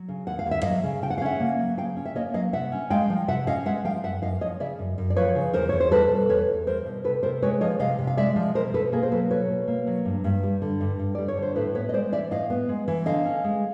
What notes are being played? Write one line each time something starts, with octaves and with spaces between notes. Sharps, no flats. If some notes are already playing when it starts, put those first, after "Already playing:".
Already playing: F#3
C#3
D#2 F#5
F5
D#2
E5
F#3 D#5 F5
C#3
C#3 G5
F#5
F5
C#4 E5 F#5
A#3
F#3
C#3 F5 G5
C#4
E5
A#3 C#5 D#5
F#3 D#5 F5
C3 E5 F#5
C#4
G#3 F5 G5
F3
C3 E5 F#5
C#4 D#5 F5
G#3 E5 F#5
F3 F5 G5
F#2 E5 F#5
F#2 D#5 F5
F3 C#5 D#5
C#3 D5 E5
F#2
F#2
D5
F3 B4 C#5
C#3
E2 A#4 C5
E2 C#5
C5
G3 A4 B4
B2
E2 B4 C#5
E2
G3 A#4 C5
B2
C3 A4 B4
C3 A#4 C5
G#3 B4 C#5
F3 C#5 D#5
C3 D#5 F5
C3
F5
G#3 D5 E5
F3
B2 A#4 C5
B2 A4 B4
A#3 G#4 A#4
C5
F#3 A4 B4
B2 B4 C#5
B2
A#3
F#3
G2
G2
G3
D3
G2
G2
G3 D5
C#5
D3 C5
A2 A4 B4
B3 B4 C#5
D#5
G#3 C5 D5
E3 D5 E5
A2 D#5 F5
B3
G#3
E3
D3 D#5 F5
C#4
G#3